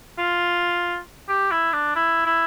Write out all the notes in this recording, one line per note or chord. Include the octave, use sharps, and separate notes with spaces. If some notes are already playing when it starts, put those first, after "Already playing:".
F4
G4
E4
D4
E4
E4